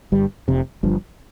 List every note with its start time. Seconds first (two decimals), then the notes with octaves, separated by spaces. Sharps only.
0.12 G1 G2 G3
0.48 F1 F2 C3
0.83 G1 G2 F3